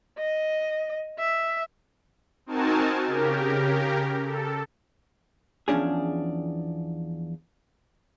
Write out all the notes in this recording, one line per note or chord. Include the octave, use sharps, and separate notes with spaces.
D#5
E5
C4 D#4 F#4 A#4 G#5 A5
C#3 G4 A#4
A4
E2 F3 C#4 D4 G#4